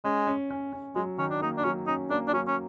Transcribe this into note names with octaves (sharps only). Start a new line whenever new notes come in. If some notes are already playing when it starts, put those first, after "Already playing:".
G#3 C#4
C#4
C#4
C#4
F#3 G#3
D#3 C#4
D4
A#3 D#4
D4
F#3 C#4
C#4 D#4
A#3 D4
D4
F#3 C#4
C#4